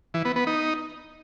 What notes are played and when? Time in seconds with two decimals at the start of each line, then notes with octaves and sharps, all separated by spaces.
0.14 E3
0.25 B3
0.36 B3
0.47 D#4